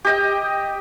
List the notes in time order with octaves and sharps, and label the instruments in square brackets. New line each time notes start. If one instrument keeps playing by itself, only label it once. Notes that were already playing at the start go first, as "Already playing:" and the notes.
[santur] G4 D#5 G5